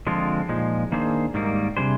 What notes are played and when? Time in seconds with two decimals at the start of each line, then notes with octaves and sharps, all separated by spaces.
0.07 D3 F3 G#3 C4 F4
0.49 A#2 F3 G#3 D#4
0.92 D#3 A#3 D4 G#4 C5
1.34 G#2 D#3 G3 A#3
1.77 C3 G3 D4 G#4 C5